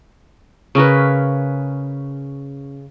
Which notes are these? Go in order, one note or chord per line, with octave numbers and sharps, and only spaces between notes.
C#3 C#4 A#4 B4